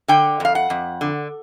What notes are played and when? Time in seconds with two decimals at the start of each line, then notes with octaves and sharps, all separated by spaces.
0.08 D3 G5
0.40 F2 F5
0.55 F#5
0.70 F2
1.01 D3